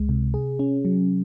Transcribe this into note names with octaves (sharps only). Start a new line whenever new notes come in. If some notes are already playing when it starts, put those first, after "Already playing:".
Already playing: C#2 G#3
C3
G#4
C#4
F#3